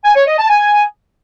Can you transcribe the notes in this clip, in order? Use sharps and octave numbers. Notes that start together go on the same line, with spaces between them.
G#5
C#5
D#5
A5
G#5